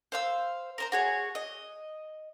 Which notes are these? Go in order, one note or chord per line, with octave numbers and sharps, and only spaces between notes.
C5 F5 E6
A#4 C5 A#5
F#4 G#4 C#5
D#5